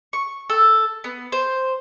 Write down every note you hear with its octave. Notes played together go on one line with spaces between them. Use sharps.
C#6
A4
B3
C5